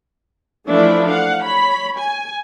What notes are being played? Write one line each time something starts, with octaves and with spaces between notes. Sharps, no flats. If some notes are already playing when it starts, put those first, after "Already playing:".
E3 F3 A3 D4 E4 E5
F5 F#5
C#5 B5
G#5